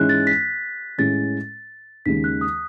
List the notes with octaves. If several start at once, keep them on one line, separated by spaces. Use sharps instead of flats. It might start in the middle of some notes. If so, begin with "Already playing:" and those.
Already playing: G#2 E3 G#3 C#4 E4 F#6
A6
B6
A2 G#3 C#4 A6
D#2 C#3 G#3 B6
F#6
D#6